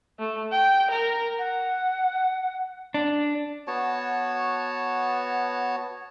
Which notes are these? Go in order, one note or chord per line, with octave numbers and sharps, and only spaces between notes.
A3
G5
A#4
F#5
D4
B3 F#4 C#5 A5